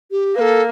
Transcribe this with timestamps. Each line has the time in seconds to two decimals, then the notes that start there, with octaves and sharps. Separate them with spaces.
0.11 G4
0.36 A#3 A4 B4